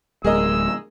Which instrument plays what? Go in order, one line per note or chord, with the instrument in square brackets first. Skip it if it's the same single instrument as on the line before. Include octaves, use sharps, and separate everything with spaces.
[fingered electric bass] D1 G#3 [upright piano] G#4 A#4 D#5 [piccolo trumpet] E6